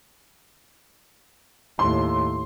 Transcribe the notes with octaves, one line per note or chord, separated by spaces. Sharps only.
D#2 A2 C6